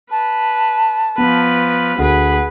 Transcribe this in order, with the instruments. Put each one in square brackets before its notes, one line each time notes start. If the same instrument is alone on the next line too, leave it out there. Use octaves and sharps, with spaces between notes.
[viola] B4 [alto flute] A5
[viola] F3 B4 [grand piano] B3
[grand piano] D2 [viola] G#4 B4 [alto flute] F#5